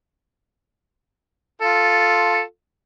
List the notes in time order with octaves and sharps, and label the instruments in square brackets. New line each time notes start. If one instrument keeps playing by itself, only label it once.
[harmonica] F4 A4